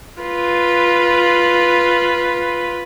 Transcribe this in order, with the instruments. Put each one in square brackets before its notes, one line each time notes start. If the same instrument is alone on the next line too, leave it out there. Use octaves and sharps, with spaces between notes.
[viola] F4 B4